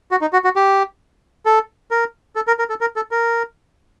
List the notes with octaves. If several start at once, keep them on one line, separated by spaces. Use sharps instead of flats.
F#4
D#4
F#4
F#4
G4
A4
A#4
A4
A#4
A#4
A4
A#4
A4
A#4